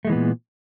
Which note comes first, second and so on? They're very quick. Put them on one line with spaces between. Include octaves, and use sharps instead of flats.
A3 G#3 E3 B3 A#2